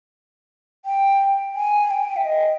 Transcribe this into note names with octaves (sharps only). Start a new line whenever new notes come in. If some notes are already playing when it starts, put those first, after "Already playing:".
G5
G#5
G5
E5
D#5